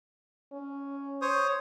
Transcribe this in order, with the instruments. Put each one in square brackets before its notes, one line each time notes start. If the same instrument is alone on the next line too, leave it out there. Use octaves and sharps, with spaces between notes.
[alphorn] C#4
[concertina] C5 C#5 D#6